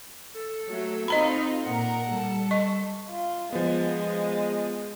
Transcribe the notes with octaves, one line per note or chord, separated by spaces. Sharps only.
A4
F#3 A3
C4 D#4 F4 D#5 A#5 B5
A#2 A#4 F#5
G3 A4
D#5 C#6
F4
F3 G#3 B3